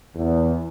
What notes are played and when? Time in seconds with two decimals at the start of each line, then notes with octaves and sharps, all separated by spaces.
0.15 E2